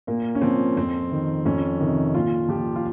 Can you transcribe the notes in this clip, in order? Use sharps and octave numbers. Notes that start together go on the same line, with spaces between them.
A#2 A#3
C#4
F3 C4
F2 C4
D#3
F2 C#4
C3 D#3
A#2 F4
F3 G4
F4